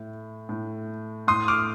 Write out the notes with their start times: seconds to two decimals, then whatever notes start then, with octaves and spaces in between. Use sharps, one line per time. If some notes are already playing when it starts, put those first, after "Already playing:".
Already playing: A2
0.49 A2
1.28 A2 C6 D#6
1.48 D6 F6